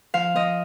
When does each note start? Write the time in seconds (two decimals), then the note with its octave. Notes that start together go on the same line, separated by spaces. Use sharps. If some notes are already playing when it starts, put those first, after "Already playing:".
0.14 F3 F5
0.36 F3 D#5